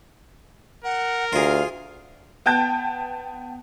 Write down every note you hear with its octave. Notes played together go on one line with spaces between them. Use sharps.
A#4 F#5
D2 F4 G#4 F5
B3 G5 A5 G6